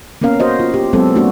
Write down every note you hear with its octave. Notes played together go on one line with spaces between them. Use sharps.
A#3 B3 C#4 A#4 F5
F#4 C5 D#5
F4
G4
F#3 G#3 B3 C4 A4
A3 A#3 D4 F#4